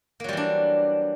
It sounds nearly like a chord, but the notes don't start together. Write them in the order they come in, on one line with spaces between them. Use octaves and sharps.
A#3 F#3 G3 E3 D4